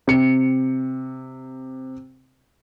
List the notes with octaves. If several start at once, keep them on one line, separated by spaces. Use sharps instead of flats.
C3 C#7